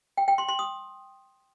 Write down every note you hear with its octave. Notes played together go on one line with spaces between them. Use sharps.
G5
G5
C6
C6
D#6